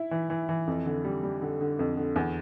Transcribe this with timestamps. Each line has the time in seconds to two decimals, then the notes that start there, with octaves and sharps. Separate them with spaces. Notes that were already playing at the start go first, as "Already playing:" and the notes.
Already playing: E4
0.11 E3
0.30 E3
0.49 E3
0.67 F2
0.86 D3
1.05 G3
1.23 G3
1.42 D3
1.61 D3
1.79 F2
1.97 D3
2.16 E2